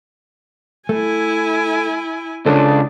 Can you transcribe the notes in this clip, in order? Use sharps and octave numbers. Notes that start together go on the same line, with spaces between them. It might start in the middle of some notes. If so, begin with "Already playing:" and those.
A3 E4 G#5
C#2 C#3 D4 A4 C5 C#5